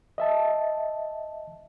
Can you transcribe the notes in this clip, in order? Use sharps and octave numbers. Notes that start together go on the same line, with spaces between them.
D#5 E5 A5